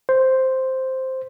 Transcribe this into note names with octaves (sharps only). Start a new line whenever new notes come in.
C5